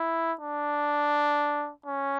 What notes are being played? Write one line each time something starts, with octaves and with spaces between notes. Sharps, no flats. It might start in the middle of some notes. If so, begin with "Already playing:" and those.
Already playing: E4
D4
C#4